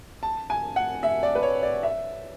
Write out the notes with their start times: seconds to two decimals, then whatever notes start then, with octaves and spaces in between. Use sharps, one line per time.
0.23 A5
0.50 G#5
0.76 F#5
1.03 E5
1.23 D5
1.35 B4
1.43 C#5
1.63 D5
1.83 E5